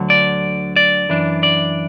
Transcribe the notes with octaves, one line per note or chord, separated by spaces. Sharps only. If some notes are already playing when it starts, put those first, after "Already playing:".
Already playing: D2 D3 F#3
D5
D5
F#2 E3 D4
D5